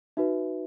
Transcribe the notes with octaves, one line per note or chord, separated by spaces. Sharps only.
D#4 F#4 B4 E5